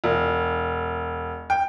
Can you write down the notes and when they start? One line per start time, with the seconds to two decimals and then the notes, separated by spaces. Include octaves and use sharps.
0.04 E1
1.50 G5